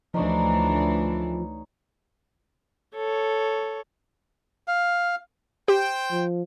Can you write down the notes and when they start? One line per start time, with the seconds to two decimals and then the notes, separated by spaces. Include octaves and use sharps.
0.14 D2 E3 F3 D4 D#4 C#5
2.95 A4 C#5
4.68 F5
5.68 G4 C5 G5
6.11 F3